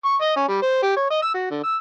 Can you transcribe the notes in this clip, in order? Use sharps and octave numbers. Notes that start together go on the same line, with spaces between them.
C#6
D#5
C#4
G3
C5
G4
C#5
D#5
E6
F#4
D3
E6